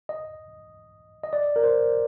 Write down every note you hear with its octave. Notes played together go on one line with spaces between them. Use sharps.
D#5
D#5
D5
A#4
C5